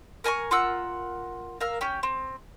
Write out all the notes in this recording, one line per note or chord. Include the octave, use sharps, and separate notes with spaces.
A#4 G#5 A#5 C#6
F4 A#4 F#5 E6
A#4 F5 E6
C#4 G4
C4